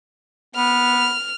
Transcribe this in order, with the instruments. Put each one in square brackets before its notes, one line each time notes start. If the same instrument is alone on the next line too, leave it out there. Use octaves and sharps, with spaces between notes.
[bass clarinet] B3 [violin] F6